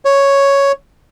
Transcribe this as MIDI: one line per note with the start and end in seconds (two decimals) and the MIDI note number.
0.05 0.72 73